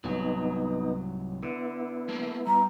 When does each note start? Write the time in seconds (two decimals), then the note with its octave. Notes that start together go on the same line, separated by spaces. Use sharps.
0.04 C2 G#2 F#3 B3 D#4
1.43 D3 B3 E4
2.08 G#3 A#3 A#4
2.47 G3 A#5